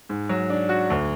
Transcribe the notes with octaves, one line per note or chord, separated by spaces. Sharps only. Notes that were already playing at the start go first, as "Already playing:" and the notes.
G#2
F#3
D4
F#4
D2